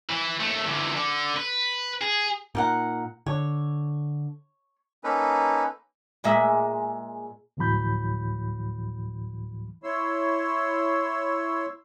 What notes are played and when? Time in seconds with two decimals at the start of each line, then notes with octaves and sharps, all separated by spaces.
0.09 E3
0.40 D#2 A3
0.67 E2 D3
0.96 D3
1.36 B4
2.01 G#4
2.55 A#2 D#4 A#4 F#5
3.26 D3 C#5
5.04 A#3 C#4 D#4 A4 B4
6.24 A#2 G#3 E5
7.57 D2 A2 E3 F#3 B5 G6
9.83 E4 C#5 C6 E6